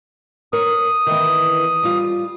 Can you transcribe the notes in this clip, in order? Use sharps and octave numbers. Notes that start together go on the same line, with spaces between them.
A#4 C#5 D#6
D#3 E3 B3
G3 F4